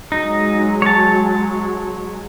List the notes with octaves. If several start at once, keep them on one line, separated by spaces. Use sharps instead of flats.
F#3 G#3 D#4
C#5 A5